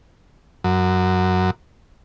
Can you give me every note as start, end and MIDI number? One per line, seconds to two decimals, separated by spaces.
0.64 1.51 42